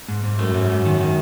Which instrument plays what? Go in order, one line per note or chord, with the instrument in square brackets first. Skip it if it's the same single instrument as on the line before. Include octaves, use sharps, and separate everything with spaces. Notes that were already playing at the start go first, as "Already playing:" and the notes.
[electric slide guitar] G#2
G#2
[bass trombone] F#2 [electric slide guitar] A3
[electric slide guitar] G#2
G#2
D#3
D#3